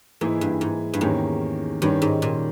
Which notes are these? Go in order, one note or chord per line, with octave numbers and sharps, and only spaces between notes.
G#2 E3 A#3 E4 G#4
G2
G#2
G2
E2 G#2 D#3 A#3 C#4 G4
G2 D#3 G3 C#4
G#2
A#2